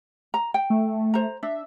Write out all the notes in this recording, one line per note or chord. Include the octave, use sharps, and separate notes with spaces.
A#5
G5
A3
C5 A#5
D4 E5